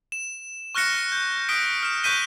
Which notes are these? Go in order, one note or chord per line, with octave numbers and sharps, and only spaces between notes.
E7
C#6 F6 F#6 A#6 C#7 E7
G6
D#6 F6 A#6 B6 D7
F6 E7
C#6 F#6 G6 B6 D#7 G7